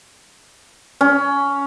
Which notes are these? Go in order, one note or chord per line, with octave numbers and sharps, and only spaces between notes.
C#4